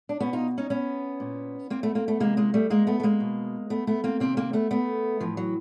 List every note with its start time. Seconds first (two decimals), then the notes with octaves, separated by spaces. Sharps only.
0.09 D4
0.20 B2 B3 C#4
0.33 D#4 F4
0.58 C#4 D#4
0.70 B3 C#4
1.20 A#2
1.70 A#3 C4
1.83 A3 B3
1.95 A#3 C4
2.08 A3 B3
2.20 C3 E3 G#3 A#3
2.37 G#3 A#3
2.54 G3 A3
2.70 G#3 A#3
2.87 A3 B3
3.00 A3
3.03 G#3 A#3
3.20 B2
3.70 A3 B3
3.87 A3 B3
4.04 A#3 C4
4.20 C3 D#3 A#3 C4
4.37 A#3 C4
4.53 A3 B3
4.71 A3 B3
5.20 A2 E3 F3
5.37 F#3